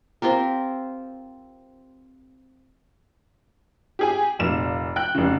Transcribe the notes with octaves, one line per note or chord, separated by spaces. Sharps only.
C4 F4 G4 A#4
G4 G#4 G#5
F1 A#2 E7
G5 F#6
F1 C#3